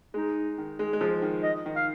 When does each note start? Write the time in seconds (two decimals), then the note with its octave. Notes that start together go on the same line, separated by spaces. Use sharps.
0.14 G#3 D#4
0.58 D#3
0.79 G#3
0.93 G#3
1.01 F3
1.22 D#3
1.43 D#5
1.66 D#3
1.76 F5